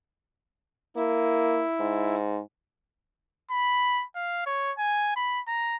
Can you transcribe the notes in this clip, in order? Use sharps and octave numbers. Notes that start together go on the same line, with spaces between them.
A#3 E4
G#2
B5
F5
C#5
G#5
B5
A#5